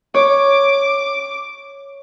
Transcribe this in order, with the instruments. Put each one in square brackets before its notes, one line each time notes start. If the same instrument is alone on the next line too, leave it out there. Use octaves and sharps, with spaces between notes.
[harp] C#5 [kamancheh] D6